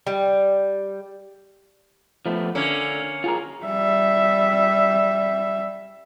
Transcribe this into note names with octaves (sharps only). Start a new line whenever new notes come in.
G3
F3 A3 B3
D3 A#3 C#4
F4 G#4 A#4
G3 E5